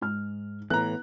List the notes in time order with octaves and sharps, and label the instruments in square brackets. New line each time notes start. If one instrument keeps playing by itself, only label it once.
[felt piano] G#2 F6
[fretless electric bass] A2 E3 [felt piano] B3 E4 [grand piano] A#5 F#6